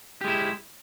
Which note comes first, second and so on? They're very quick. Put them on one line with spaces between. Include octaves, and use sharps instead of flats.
G4 G#3 E4